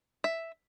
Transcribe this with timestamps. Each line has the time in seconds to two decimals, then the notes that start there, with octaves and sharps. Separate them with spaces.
0.24 E5